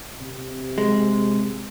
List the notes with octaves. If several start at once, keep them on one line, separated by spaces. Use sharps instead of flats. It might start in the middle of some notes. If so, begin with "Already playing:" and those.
C3
G#3